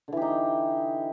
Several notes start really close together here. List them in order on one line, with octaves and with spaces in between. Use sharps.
D3 E3 G4 D#4